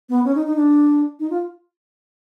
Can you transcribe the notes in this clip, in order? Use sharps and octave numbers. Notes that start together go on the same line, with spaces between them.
B3
C#4
D#4
D#4
D4
D#4
F4